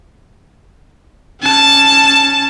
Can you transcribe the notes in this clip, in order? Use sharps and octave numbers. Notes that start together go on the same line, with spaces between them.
C#4 A5